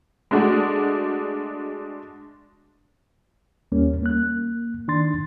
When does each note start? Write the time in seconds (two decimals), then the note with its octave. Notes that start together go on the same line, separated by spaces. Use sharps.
0.31 G#3 A3 D4 F#4
3.72 D#2 G3 A#3 C#4
4.03 A#3 F#6
4.88 D#3 D4 C6 A6